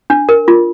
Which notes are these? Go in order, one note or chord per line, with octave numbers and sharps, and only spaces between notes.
D4
A#4
F4